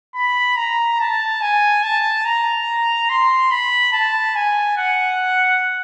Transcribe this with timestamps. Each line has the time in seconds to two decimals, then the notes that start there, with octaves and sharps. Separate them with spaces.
0.15 B5
0.57 A#5
1.00 A5
1.42 G#5
1.83 A5
2.25 A#5
3.10 C6
3.51 B5
3.93 A5
4.35 G#5
4.78 F#5